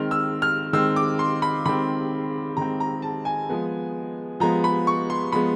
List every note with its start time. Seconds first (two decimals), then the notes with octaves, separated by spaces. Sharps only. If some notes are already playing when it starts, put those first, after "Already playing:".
Already playing: D#3 G#3 C4 F6
0.11 E6
0.42 F6
0.73 D#3 G#3 C4 E6
0.96 D6
1.19 C6
1.42 B5
1.66 D#3 G#3 C4 B5
2.57 D#3 G#3 C4 A#5
2.80 A#5
3.02 A5
3.25 G#5
3.49 F3 G#3 B3
4.40 F3 G#3 B3 A#5
4.64 B5
4.87 C#6
5.10 C6
5.32 F3 G#3 B3 B5